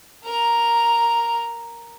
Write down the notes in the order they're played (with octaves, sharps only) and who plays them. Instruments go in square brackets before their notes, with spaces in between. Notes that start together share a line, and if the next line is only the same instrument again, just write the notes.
[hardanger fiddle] A#4 A#5